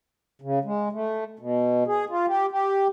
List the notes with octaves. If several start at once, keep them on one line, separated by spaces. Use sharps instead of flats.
C#3
G#3
A3
B2
G#4
F4
G4
G4